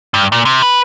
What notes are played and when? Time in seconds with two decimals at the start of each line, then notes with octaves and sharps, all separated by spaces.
0.14 G2
0.32 A#2
0.45 C3
0.62 B4